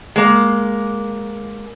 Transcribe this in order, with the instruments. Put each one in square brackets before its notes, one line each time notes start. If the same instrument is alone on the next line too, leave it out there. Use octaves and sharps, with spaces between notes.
[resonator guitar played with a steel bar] G#3 A#3